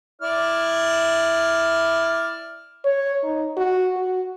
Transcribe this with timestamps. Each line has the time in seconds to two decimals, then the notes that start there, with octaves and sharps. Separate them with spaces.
0.22 E4 D5 F6
2.85 C#5
3.24 D#4
3.57 F#4
3.97 F#4